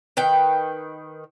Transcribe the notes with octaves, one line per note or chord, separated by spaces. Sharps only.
D#3 B4 G5